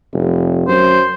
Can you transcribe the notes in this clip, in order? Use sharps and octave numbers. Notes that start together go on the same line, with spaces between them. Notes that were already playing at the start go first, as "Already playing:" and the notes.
F1
F#2 C5